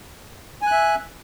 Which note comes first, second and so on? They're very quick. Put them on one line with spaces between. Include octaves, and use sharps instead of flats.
G#5 F#6 E5